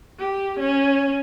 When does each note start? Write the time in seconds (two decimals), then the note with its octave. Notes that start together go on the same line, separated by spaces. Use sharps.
0.19 G4
0.60 C#4